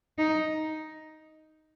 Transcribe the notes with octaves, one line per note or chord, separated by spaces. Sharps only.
D#4